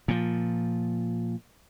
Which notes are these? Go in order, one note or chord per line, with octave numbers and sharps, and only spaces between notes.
A#2 F3